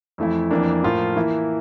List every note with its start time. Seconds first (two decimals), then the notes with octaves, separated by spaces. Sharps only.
0.18 F2 E3 A3 E4
0.51 F2 E3 A#3 D4
0.84 A2 F3 A#3 F4
1.16 E3 A#3 E4